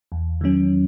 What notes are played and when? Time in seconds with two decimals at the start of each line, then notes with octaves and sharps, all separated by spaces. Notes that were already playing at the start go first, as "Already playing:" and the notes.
0.12 E2
0.41 D#3 F#3 C#4